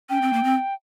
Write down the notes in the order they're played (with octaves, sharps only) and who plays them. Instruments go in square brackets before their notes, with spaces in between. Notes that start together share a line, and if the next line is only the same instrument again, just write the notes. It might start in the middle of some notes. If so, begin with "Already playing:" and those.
[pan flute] C#4 [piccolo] G5
[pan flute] C4
A#3
C4